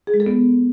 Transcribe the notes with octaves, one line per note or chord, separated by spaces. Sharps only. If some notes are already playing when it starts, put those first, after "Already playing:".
G#4
G#3
A4
B3